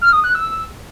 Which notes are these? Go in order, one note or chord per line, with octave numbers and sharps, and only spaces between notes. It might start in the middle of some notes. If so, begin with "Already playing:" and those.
F6
D#6
F#6
E6